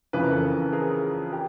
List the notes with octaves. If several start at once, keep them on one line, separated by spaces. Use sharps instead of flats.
F2 C#3 E3 B4
A#4
A4 B4
G#4 A#4
G4